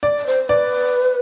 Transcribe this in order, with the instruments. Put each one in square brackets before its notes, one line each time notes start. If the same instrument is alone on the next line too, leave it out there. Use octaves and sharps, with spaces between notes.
[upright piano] D5
[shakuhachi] D5
C5
[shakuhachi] B4 [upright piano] D5